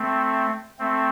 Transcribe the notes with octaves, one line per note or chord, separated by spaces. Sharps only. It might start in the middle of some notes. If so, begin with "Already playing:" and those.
Already playing: A3 C4
A3 C4